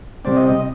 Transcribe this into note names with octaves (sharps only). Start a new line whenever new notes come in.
C3 G3 C4 D5
D#5
D#5